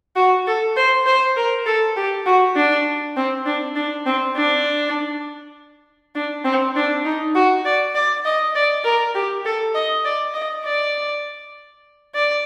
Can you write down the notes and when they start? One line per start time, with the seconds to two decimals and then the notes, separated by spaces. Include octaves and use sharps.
0.16 F#4
0.47 A4
0.76 C5
1.06 C5
1.36 A#4
1.66 A4
1.96 G4
2.26 F#4
2.56 D4
3.17 C4
3.46 D4
3.76 D4
4.06 C4
4.36 D4
6.15 D4
6.45 C4
6.76 D4
7.05 D#4
7.35 F#4
7.65 D5
7.95 D5
8.25 D#5
8.55 D5
8.84 A#4
9.15 G4
9.45 A4
9.75 D#5
10.05 D5
10.34 D#5
10.65 D5
12.14 D5